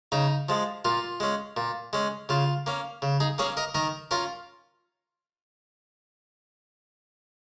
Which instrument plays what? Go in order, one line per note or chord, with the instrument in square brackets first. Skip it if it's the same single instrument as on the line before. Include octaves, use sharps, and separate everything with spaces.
[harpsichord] C#3 D#4
F3 G#3
A#2 F4
G#3 C#4
A#2
G#3 C#4
C#3 F4
A#3 C#4
C#3
D#4 G#4
A#3 C#4 G#4 C#5
A#4 D#5
D#3 A#4 D#5
C#4 F4 A#4